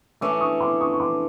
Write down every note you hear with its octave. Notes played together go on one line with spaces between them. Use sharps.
E3 A3 C#4 D6 E6
C#6 D#6
C6 D6
C#6 D#6
C#6
C6 D6